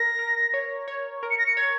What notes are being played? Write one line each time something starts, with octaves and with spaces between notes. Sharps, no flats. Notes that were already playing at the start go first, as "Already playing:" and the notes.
Already playing: A#4 A#6
A#4
C#5
C#5
A#4
C#7
A#6
C#7
C#5 G#6